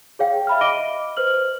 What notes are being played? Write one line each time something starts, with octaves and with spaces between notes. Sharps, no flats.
G#4 C#5 F5 G5
E5 B5 F6
D#5 D6 A#6 D7 D#7 G7
B4 C5 F6 F#7